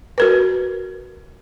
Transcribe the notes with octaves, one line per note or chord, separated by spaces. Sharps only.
F#4 A#4 B4